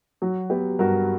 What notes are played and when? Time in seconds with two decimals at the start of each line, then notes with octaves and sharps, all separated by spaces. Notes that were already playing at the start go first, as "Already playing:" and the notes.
0.22 F#3 F#4
0.50 B3 G4
0.79 G2 F#4 A#4